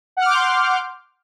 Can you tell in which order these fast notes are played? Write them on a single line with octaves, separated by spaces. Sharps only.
F#5 F6 D6 G6 C6